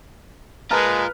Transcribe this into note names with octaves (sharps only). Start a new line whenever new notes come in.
G#3 F4 A#4 B4 A5 A#5 F6